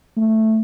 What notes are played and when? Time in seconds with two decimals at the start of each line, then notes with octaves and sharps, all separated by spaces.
0.17 A3